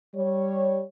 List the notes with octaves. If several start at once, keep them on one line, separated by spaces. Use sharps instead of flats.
G3 C#5